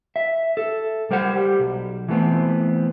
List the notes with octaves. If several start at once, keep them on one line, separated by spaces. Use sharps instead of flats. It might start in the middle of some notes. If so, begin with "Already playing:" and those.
E5
A4
G3 A#4 C5 F#5
G3
B1
E3 A3 B3 C4